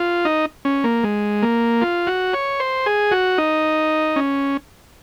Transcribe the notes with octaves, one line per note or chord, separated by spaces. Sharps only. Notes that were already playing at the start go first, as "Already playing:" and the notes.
Already playing: F4
D#4
C#4
A#3
G#3
A#3
F4
F#4
C#5
C5
G#4
F#4
D#4
C#4